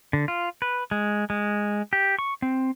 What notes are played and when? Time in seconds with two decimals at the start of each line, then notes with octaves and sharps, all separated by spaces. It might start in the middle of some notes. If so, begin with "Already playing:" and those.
0.13 D3
0.28 F4
0.62 B4
0.91 G#3
1.30 G#3
1.93 G4
2.19 C#6
2.42 C4